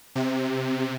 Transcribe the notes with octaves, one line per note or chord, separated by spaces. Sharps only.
C3